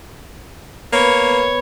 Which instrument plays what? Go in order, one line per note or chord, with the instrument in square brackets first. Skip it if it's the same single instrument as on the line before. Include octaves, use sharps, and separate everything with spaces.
[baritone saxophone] A#3 [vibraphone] B3 B4 B5 [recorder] C#5